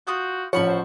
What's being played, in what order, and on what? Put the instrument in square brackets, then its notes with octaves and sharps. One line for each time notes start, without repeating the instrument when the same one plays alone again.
[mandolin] F4 D#6 G6 [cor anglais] F#4
[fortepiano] A1 F3 [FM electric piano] C#5 [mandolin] F#5 B5 C#6
[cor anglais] C5